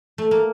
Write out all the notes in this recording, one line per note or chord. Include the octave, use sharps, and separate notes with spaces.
A3
A#3